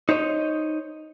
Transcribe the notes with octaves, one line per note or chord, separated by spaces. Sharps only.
D#4 C5 C#5 D#5